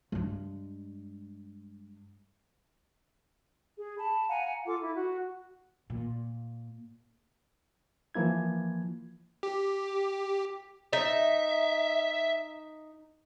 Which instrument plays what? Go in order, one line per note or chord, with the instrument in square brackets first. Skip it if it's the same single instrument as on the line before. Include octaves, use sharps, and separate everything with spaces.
[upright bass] G2 G#3
[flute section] G#4
A5 B5
F5 F#5 G#5 A#5
F4 A4 D6
E4
F#4
[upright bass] A#2
[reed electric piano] E3 F3 A#3 E4 G#6
[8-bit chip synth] G4
[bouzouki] D#4 [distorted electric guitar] E5